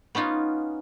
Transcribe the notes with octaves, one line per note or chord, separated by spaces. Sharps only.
B3 C#4 D#4 F4